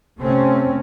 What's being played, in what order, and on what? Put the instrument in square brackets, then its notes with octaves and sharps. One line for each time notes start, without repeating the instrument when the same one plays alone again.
[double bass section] C3 A3 C4 C#4